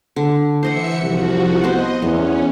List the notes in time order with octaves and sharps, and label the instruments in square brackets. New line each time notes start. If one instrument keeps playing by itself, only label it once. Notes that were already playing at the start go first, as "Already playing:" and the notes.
[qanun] D3
[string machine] E3 E5 C#7 [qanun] C5 D#5 F#5
[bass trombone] C2 [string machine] F3 F#4
[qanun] B3 C5 [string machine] D#5
[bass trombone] E2 [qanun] B3 [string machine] C#4